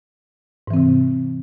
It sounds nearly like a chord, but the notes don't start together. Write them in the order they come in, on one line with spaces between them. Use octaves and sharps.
G#2 E3 C4 C3